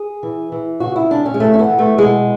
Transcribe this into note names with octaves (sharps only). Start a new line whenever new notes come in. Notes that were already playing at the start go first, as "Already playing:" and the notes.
Already playing: G#4
E3
E3
C#3 F#4
E4
C#3 D4
C#4
G#3
E3 A3
C#4
B3
E3
A3
B2 G#3